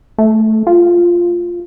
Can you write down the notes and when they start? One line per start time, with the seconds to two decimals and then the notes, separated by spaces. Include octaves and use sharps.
0.18 A3
0.67 F4